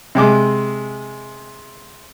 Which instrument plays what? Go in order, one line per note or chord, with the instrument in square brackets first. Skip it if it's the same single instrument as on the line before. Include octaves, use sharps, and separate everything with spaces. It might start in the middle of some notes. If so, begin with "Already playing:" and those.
[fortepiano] C3 G#3 D6